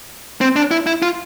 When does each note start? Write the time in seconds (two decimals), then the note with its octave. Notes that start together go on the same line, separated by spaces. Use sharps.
0.41 C4
0.56 D4
0.71 E4
0.87 E4
1.02 F4